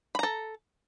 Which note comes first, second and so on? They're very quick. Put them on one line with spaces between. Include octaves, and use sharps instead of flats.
B5 A#5 A4